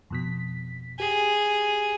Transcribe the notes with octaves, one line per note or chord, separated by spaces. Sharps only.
F2 B2 B6
G4 G#4